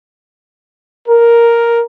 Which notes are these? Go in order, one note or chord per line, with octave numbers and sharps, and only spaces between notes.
A#4